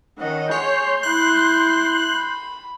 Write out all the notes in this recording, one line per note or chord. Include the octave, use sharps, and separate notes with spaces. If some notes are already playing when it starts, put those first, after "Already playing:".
D#3 C#4 D#5 F#5
G#4 C#5 C6 G6
E4 F#6
B5